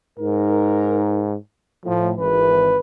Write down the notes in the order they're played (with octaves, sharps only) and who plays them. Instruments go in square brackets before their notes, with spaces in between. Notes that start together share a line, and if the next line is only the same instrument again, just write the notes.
[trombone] G#2 [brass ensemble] D#4 A#4
[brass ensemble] A2 [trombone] F3
[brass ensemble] G#1 E3 [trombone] B4